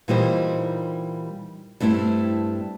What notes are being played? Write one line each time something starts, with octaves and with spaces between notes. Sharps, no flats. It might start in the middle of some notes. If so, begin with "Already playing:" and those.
A#2 E3 G3 D#4 G4 C5
G2 A3 C4 E4 G4